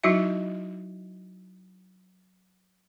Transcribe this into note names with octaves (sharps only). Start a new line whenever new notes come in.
F#3 D#4 E4 F#4 D#5 E5